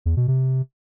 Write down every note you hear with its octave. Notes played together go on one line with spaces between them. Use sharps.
E2
B2
C3